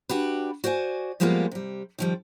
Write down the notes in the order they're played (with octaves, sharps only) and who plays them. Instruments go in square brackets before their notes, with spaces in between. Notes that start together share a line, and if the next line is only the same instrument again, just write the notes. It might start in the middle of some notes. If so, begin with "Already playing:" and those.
[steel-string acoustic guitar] D4 F#4 G4 B4
F#4 C5 D5 F5 G#5
F3 G3 G#3 A#3 B3 F4
C3 G3
D#3 F3 G3